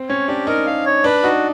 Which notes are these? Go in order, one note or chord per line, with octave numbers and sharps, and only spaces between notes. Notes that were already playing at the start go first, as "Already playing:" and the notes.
Already playing: C4
C#4 C#5
D4 G4
D#4 A#4
F5
C#5
D4 B4
D#4 F#4